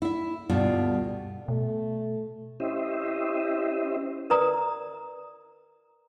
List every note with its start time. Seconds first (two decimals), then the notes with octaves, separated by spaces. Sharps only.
0.02 E4 E5
0.49 D2 G2 B2 G3 F4 E5
1.48 B2 A3
2.60 C#4 E4 G4 C5 D#5 E5
4.30 A#4 B4 D5 A#5 D#6